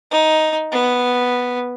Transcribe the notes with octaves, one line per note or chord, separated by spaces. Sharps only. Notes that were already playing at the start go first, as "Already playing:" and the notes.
D#4
B3